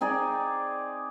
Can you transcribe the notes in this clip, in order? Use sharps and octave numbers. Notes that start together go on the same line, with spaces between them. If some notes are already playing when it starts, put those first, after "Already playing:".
C4 D#4 G#4 D5